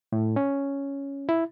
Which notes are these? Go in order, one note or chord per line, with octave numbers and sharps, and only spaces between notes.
A2
C#4
E4